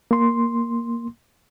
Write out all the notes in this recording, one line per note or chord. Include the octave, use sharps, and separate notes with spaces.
A#3 C6